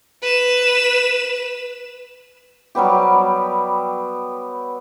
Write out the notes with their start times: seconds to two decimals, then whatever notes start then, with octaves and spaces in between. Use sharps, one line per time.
0.22 B4 E7
2.75 F#3 G3 B3 G4